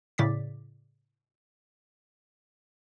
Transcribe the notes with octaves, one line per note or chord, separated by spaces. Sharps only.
A2 C#3 D5 D6 A6 B6